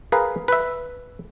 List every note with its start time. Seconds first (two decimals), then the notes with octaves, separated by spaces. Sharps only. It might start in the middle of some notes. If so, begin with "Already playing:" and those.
0.12 G#4 A#4 B4 F5
0.48 B4 E5